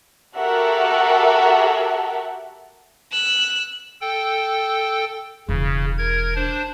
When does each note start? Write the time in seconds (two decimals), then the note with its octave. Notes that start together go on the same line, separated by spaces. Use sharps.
0.37 F#4 G4 A4 A#4 E5 F#5
3.12 E6 F#6
4.01 A4 G5
5.49 E1 C#3
5.98 A#4 G#6
6.36 D4 C5